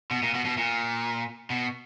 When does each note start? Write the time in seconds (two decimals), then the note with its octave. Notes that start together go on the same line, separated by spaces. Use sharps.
0.11 B2
0.22 A#2
0.34 B2
0.45 B2
0.57 A#2
1.50 B2